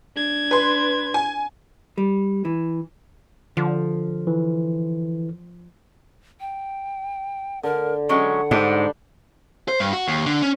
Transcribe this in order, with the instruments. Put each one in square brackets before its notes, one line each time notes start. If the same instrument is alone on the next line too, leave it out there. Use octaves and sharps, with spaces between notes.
[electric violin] D4 G#6
[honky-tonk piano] B4 C6
G#5
[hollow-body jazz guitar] G3
E3
[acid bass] D3 [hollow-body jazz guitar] F3
[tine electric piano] E3
[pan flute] G5
[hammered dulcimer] D3 [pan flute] A#4
[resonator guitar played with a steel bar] F#3 G#3 C#4 [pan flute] F#5
[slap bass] G#2 [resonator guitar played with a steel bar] G3 D4
[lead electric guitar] C5
G2
F#4
D#2
D3
C#4